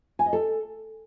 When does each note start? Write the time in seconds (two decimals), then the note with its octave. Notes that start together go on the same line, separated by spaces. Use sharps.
0.19 G#5
0.26 D#5
0.33 A4